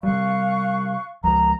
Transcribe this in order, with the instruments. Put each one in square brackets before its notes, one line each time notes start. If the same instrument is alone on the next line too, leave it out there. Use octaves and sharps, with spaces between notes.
[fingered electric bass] C3 G3 [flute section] F5 C#6 F#6
[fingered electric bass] C#2 F3 G#3 [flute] A#5